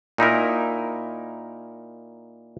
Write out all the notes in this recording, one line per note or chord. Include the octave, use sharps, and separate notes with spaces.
A#2 D#4 E4 A#4